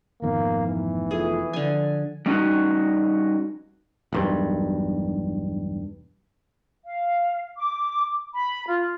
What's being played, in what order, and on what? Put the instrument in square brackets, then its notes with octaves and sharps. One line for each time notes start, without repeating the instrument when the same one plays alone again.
[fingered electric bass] F1 D#3 B3 [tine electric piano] G#2 F3 [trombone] A#3
[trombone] E3
[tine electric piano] F4 A4 E5 [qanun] G#4
[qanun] D3 G#5 [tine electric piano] F3
[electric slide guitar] G3 C#4 D#4 F#4
[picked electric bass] E1 B1 G2
[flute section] F5
D6
B5
F4